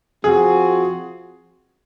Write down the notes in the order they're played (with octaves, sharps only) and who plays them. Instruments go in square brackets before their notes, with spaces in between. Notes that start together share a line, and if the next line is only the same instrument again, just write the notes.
[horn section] F3 C4 F#4 [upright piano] G#4